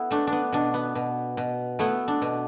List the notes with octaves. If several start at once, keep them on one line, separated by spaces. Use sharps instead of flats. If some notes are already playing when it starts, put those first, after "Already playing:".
Already playing: B3 E4 A4
A3 D4
D4
B3
B2 D4
B3
B2
B2
A3 B3 E4
D4
B2